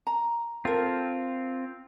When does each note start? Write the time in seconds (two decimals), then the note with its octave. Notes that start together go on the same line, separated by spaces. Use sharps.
0.07 A#5
0.65 C4 F4 A4 A#4